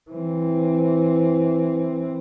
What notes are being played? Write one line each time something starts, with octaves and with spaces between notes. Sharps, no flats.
E3 C4